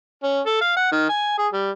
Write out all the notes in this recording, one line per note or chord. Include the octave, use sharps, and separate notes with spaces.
C#4
A4
F5
F#5
D#3
G#5
G#4
G3